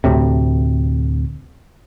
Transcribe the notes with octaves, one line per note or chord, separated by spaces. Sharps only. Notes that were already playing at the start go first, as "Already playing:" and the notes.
D2 A2 C3